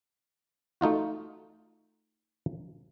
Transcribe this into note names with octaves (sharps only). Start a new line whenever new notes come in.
A3 D#4 F4 F#4